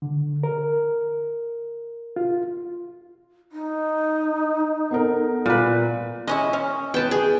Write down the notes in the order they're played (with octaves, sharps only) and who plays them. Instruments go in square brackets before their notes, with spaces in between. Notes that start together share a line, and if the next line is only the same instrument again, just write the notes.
[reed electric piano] D3
A#4
F4
[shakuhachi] D#4
[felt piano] B3 A4 A#4
[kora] A#2 B4
[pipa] G#3 C#4 E4 [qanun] D#5
[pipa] C#4
[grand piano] B3 B4 [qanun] G5 A5
[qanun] G#4